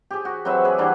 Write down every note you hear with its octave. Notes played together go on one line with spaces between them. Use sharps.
G4 G#4
F#4
F#3 C4 B4 E5
G#4 B4 D5
E3 F#3 G3 D4